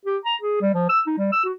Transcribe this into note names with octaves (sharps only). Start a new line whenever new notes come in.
G4
A#5
G#4
G3
F3
E6
D#4
G3
E6
F#4